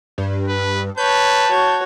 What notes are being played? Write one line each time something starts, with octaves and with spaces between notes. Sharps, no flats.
G2
B4
B4 C#5 A5 G6
F#4 C#5